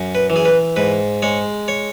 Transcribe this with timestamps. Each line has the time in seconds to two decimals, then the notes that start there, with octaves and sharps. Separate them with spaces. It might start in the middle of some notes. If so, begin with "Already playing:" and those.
Already playing: F#2
0.15 B4
0.30 E3
0.36 G#4
0.45 B4
0.76 G#2 B4
1.22 G#3 C#5
1.68 C#5